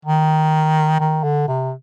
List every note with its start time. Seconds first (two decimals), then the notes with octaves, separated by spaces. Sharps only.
0.05 D#3
1.00 D#3
1.23 D3
1.48 C3